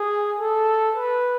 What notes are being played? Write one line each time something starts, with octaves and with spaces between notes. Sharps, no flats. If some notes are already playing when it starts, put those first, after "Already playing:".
Already playing: G#4
A4
B4